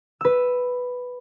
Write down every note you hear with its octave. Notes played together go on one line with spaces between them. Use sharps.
B4 E6